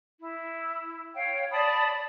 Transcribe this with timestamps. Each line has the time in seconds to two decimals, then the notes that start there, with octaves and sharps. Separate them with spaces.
0.20 E4
1.16 C#5 F5 G5
1.51 D5 A5 B5 D#6